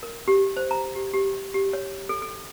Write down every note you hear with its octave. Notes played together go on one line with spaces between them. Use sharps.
A#4
G4
C5
A#5
G4
G4
G4
C#5
A4
A4